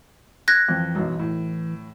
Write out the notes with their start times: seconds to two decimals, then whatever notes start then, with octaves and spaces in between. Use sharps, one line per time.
0.48 F#6 G#6 A#6
0.68 F2 E3
0.95 B1 F#2
1.19 A2